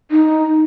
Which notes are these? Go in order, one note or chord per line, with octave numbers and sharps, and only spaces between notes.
D#4